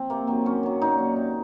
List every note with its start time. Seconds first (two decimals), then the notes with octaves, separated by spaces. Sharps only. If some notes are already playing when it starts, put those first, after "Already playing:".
Already playing: F3 C4
0.10 C3 A#3
0.27 D#3 F#3 C4
0.46 F#2 C#4
0.63 D#3 F#3
0.82 A#2 D#4
0.98 F#3
1.16 C3